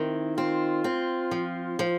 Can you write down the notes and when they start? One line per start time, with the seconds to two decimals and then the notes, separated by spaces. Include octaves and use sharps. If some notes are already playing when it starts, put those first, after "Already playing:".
Already playing: D#3 C4 E4
0.37 C4 F4
0.84 C4
1.31 F3
1.79 F3